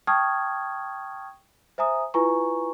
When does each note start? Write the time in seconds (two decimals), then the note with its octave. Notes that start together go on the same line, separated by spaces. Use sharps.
0.07 G5 A5 C#6 D#6 F6 G#6
1.78 C5 E5 G#5 A#5 D#6
2.14 E4 F4 B4 G#5 A#5 C#6